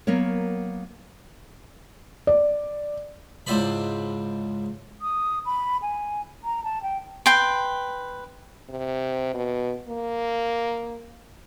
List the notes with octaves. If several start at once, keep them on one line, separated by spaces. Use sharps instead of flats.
F#3 A#3 B3 A#4 C#5
D5
C#2 G#2 E4 C5 D5 B5
D#6
B5
G#5
A#5
A5
G5
B4 G5 C6
C3
B2
A#3